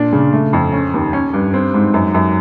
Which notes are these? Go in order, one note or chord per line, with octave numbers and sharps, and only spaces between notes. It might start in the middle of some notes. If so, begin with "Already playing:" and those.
Already playing: A#2 D4
C#3
A3
F2
C#4
D#2
C#4
G2
C4
G#2
F#2
F#2